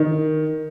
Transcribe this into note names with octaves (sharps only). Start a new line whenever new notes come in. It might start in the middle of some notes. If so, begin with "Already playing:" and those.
Already playing: D#3